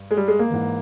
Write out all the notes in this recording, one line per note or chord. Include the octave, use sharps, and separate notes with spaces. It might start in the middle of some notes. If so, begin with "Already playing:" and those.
Already playing: G2
G#3
G3
G#3
A#3
G#2 E3